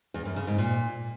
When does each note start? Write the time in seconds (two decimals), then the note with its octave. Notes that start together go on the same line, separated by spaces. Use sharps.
0.14 E2
0.25 F#2
0.36 C#3
0.47 G#2
0.58 A#2